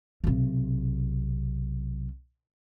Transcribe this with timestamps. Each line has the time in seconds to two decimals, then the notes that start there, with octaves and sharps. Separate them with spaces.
0.24 B1 C3